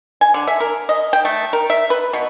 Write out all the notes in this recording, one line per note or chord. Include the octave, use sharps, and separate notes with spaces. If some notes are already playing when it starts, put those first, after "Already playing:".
G#5
D3
E5
A#4
D#5
G5
A3
A#4
E5
B4
B2